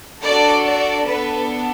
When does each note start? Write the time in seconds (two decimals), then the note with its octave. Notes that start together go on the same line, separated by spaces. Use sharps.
0.22 D4 F#4 A4 D5
0.64 D5
1.05 B3 D4 A4 B4